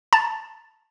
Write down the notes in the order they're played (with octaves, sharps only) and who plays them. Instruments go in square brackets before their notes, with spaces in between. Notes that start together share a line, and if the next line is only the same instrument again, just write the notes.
[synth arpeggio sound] A5 A#5 A6